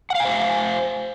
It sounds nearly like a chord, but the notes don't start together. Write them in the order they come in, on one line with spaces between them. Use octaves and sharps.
F#5 F5 G#5 C5